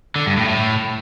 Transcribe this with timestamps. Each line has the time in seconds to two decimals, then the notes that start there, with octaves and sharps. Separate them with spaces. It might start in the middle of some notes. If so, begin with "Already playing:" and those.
0.16 D3
0.26 G2
0.37 A2
0.48 A2